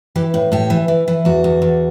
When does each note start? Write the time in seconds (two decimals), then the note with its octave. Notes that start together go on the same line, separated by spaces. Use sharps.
0.16 E3 G4
0.34 A2
0.52 A2 G4
0.70 E3
0.88 E3
1.08 E3
1.25 E2 F#4
1.44 E2
1.62 E2